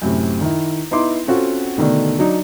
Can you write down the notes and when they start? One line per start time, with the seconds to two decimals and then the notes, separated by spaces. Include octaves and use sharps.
0.02 F#2 A2 C3
0.41 D#3 E4
0.91 B3 D#4 E4 C6 D6
1.27 C4 C#4 F4 F#4 A4
1.78 B2 D3 D#3 A3
2.19 F#3 D4 D#4